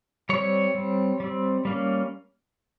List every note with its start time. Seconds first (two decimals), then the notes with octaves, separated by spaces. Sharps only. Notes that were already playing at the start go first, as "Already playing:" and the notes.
0.29 G3 C4 C#5
0.75 G3 C4
1.20 G3 C4
1.65 G3 A#3 C#4